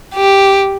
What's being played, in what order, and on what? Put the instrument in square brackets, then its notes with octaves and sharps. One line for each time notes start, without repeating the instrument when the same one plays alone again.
[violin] G4